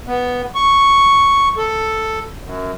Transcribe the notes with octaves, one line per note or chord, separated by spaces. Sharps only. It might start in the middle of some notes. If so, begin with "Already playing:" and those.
B3
C#6
A4
F#2